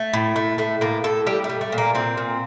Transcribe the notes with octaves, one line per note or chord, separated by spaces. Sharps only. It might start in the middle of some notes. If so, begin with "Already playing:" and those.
Already playing: A3
A2
A3
A2 A3
A2 A#3
A2 A4
G3 G4
A3
G3
A3
A#2
A#3
A#2 C4
A#2